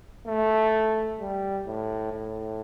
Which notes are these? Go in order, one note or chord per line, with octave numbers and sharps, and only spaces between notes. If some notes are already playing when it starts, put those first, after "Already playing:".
A3
G3
A2
A2